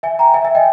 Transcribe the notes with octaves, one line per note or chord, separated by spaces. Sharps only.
E5 G#5
G5 A#5
E5 G#5
E5 G#5
D#5 G5